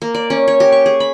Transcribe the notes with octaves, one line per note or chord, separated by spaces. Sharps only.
A#3
D5
C#4
C#5
G4
C#6
G#4
B5